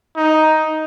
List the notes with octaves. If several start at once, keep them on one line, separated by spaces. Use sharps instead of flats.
D#4